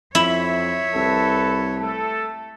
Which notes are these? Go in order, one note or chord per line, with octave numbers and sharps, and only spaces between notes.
F2 E4 C#5 E5
C2 A4 B4
A3 A4